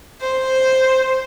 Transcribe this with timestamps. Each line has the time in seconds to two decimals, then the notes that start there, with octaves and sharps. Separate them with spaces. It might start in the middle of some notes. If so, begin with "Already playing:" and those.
0.20 C5